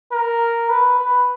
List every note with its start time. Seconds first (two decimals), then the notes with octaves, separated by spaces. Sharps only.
0.12 A#4
0.69 B4
0.99 B4